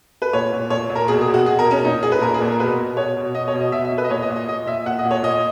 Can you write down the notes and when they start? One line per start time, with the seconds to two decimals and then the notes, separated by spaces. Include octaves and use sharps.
0.22 B4
0.33 A#2 C#5
0.52 A#2
0.70 A#2 C#5
0.89 A#2
0.95 A#4
1.08 B2 G#4
1.21 G#4
1.27 B2
1.34 F#4
1.46 B2 G#4
1.59 A#4
1.65 B2
1.71 C#4
1.83 A#2 D#4
2.03 A#2 G#4
2.12 B4
2.21 A#2 A#4
2.34 G#4
2.41 A#2
2.47 A#4
2.60 B2 B4
2.78 B2
2.97 B2 C#5
3.17 B2
3.34 B2 D#5
3.48 C#5
3.54 B2
3.60 D#5
3.72 B2 E5
3.85 E5
3.92 B2
3.98 B4
4.04 D#5
4.10 A#2 C#5
4.23 D#5
4.30 A#2
4.36 D#5
4.48 A#2 D#5
4.66 A#2 E5
4.86 A#2 F#5
4.99 D#5
5.05 A#2
5.11 C#5
5.23 A#2 D#5